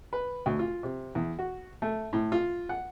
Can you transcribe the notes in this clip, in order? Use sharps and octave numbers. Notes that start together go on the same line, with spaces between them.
B4
D2
F4
C3
E2
F#4
A3
A2
F4
F#5